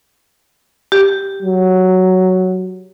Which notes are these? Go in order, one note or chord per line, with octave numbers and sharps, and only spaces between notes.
G4
F#3